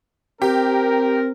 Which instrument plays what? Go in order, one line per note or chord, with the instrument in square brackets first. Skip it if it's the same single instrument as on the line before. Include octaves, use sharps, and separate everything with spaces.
[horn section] C4 A#4 [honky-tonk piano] G4